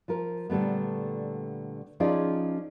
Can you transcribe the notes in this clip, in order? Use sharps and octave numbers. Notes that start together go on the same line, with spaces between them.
F3 F4 A#4
A#2 D3 G3 A3 B3
F3 C#4 D#4 F4 G#4 D5